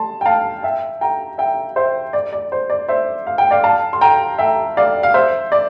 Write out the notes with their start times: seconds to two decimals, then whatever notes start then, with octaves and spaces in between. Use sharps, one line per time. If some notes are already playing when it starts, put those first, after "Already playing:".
Already playing: A5 C6
0.21 G5
0.26 F5 A5
0.63 E5 G5
1.01 G5 A#5
1.38 E5 G5
1.76 C5 E5
2.13 D5
2.33 D5
2.52 C5
2.70 D5
2.88 C5 E5
3.27 F5
3.38 G5
3.51 D5 F5
3.64 F5 A5
3.93 C6
4.01 G5 A#5
4.39 E5 G5
4.77 D5 F5
5.03 F5
5.14 C5 E5
5.52 D5